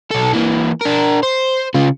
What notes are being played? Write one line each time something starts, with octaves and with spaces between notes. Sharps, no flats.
B1 A4
E3 A#3
D4 A#4
C5
C#3 F4